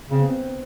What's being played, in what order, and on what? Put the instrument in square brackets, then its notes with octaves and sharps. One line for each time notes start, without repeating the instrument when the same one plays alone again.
[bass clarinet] C#3 [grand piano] C4
[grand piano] B3
C4